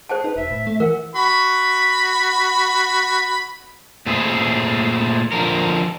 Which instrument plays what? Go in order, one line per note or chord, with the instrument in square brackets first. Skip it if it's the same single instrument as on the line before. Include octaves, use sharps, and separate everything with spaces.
[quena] G#4 [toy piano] C5 G5 A5
[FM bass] D#4 [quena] B4
[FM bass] E1 [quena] E5
[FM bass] A2
A3
[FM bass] E3 [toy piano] A#4 [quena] F#5
[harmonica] F#4 B5
[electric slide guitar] A#2 A3 E4 G#4 C5
D3 F3 A#4